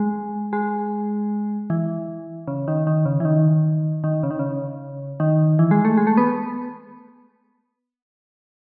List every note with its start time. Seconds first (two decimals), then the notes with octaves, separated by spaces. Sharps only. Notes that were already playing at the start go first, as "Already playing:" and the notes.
Already playing: G#3
0.53 G#3
1.70 E3
2.48 C#3
2.68 D#3
2.87 D#3
3.06 C#3
3.20 E3
3.25 D#3
4.04 D#3
4.23 C#3
4.31 D#3
4.39 C#3
5.20 D#3
5.59 E3
5.71 G#3
5.85 A3
5.97 G#3
6.07 A3
6.17 B3